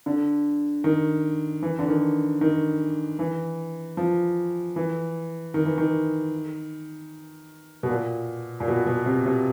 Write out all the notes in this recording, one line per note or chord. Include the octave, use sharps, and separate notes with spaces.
D3
D#3
E3
D3
D#3
D#3
E3
F3
E3
D#3
E3
D#3
B2
A#2
A#2
B2
B2
C3
C3